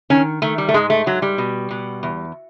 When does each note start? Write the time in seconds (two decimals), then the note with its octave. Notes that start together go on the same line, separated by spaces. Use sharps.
0.10 D#3 C#4
0.42 D#3 A3
0.58 G3
0.68 A3
0.74 G#2 G#3
0.90 A3
1.06 G#2 F#3
1.22 G3
1.38 B2
1.71 B2
2.03 E2